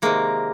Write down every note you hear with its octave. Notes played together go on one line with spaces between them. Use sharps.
C3 D#3 G#3 A#3